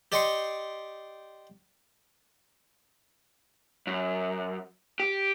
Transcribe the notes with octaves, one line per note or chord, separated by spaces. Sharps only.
G4 D5 D#5 G5 C6 C#6
F#2
G4